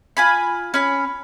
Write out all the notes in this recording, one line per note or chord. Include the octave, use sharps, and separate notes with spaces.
F4 G#5 B5
C#4 B5